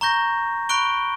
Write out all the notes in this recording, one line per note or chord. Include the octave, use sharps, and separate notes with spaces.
A#5 C#6 G6 A#6
B5 C#6 F#6 D7 G7